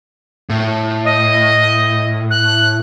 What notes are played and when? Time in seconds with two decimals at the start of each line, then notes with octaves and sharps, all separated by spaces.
0.50 A2
1.05 D#5
2.30 F#6